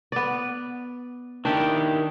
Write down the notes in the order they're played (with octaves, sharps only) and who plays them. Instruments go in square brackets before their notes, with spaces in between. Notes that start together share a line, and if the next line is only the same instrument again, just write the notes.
[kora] B3 D5
[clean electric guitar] D#3 E4 G4 [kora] D4 [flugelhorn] G5